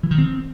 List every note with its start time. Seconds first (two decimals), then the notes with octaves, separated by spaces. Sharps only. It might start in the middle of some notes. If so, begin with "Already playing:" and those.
0.03 E3
0.11 D#3
0.18 C4